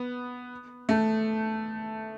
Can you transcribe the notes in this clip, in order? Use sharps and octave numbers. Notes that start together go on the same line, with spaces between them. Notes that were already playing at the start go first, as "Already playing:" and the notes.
Already playing: B3
A3